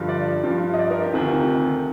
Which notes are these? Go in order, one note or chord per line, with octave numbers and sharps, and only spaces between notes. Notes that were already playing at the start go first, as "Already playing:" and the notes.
Already playing: G2 D3 F3
D5
G2 F3
D#5
D5
A#4
G4
D2 C3 D#3 F4